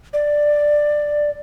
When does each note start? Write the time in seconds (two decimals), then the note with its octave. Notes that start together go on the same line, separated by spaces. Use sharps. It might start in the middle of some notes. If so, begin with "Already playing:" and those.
0.13 D5